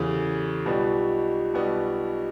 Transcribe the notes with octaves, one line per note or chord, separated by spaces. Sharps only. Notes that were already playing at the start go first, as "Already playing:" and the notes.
Already playing: E2 C#3 E3 G4 A4
B1 B2 G3 B3 F4 G4
B1 B2 G3 B3